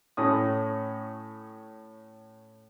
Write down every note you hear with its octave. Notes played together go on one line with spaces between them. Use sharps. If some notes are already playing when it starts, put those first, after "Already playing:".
A2 C#4 D#6